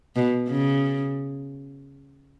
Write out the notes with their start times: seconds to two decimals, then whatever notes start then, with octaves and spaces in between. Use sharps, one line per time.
0.16 B2
0.49 C#3